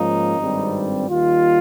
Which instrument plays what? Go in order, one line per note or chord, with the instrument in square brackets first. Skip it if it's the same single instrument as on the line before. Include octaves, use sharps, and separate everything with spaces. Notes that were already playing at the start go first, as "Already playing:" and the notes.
Already playing: [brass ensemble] G#2 F3 A#3 C#4 D#4
G#1 G2 G3 C4
D#2 D#3 G3 F4